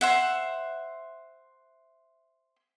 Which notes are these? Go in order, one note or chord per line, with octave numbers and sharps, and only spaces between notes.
C5 E5 F#5